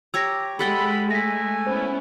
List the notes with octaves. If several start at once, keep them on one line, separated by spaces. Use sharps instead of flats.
G4 C#5 A#5 E6 A#6
G#3 G4 A4 F#5 G5 B5 A6
A3 G#5 A#6 B6
B3 C#4 E4 C5